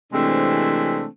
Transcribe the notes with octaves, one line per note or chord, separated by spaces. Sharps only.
C3 E3 G#3 A3 C4 D4